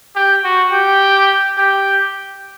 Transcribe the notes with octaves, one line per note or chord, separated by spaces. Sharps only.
G4
F#4
G4
G4